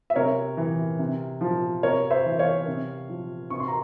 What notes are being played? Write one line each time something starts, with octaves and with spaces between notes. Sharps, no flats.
E5
C3 A#4 C#5
E3
C3
F3
C3 A#4 C#5
C5 E5
E3
C#5 F5
C3
F3
C3 C#6
C6
A#5